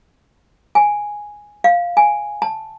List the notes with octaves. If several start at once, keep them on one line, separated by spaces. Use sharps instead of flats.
G#5
F5
G#5
A5